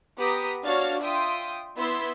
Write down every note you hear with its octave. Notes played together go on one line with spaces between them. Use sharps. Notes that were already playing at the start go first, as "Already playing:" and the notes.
B3 G4 A#5 D#6 B6
D4 F#4 C#5 F5 F6 A6
F4 E5 G5 C6 D#6
B3 E4 C6 E6 G#6 B6